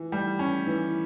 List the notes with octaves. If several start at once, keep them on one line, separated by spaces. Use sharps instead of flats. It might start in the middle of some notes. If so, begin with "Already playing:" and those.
Already playing: E3
G3
C#4
E3